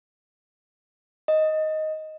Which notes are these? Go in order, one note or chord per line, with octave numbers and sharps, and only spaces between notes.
D#5